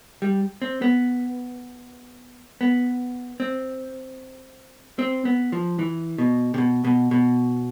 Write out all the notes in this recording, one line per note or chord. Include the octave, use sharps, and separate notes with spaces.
G3
C4
B3
B3
C4
C4
B3
F3
E3
B2
C3
B2
B2
B2